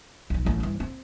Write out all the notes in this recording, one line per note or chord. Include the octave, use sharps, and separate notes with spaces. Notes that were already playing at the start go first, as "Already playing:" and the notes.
B1 F3
A1 F#3
G2 E3
C4